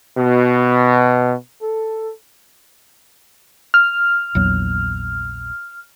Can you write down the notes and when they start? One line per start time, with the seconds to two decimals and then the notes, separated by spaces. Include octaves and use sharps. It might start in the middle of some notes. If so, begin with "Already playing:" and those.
0.18 B2
1.62 A4
3.74 F6
4.35 A#1 E2 F#3